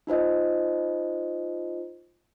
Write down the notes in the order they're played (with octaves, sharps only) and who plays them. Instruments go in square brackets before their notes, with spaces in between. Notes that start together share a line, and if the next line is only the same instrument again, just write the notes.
[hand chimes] D#4 F4 C5 D#5